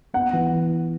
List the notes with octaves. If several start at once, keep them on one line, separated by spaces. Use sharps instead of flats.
B3 F#5
E3